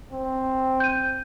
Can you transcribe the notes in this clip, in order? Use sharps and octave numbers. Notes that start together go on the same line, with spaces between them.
C4
G6 D#7